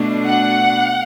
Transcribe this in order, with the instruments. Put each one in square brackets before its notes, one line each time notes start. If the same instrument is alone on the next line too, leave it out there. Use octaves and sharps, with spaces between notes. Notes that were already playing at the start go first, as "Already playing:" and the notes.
Already playing: [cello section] B2 A3 D4
[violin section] F#5